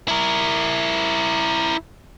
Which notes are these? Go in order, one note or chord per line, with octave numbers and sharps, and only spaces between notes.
E4 A#4